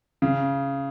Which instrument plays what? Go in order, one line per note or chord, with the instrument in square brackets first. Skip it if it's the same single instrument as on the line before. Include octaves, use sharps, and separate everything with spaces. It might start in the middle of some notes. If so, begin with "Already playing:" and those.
[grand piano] C#3